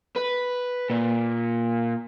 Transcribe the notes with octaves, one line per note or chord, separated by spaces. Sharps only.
B4
A#2